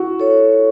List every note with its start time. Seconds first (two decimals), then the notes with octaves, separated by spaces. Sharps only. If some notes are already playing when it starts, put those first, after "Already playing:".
Already playing: E4 F#4
0.20 A4 C#5